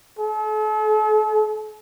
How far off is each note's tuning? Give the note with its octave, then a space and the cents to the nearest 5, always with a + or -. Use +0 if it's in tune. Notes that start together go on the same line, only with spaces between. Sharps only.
A4 -45